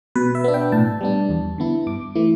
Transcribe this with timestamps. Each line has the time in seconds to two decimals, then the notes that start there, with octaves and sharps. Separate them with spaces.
0.16 B2 B4
0.35 E5
0.44 B3 D4
0.54 G5
0.72 A2 A5
1.01 G3 B3 D4
1.29 E2
1.58 D3 B3 E4
1.87 G2 D6
2.15 E3 A3 E4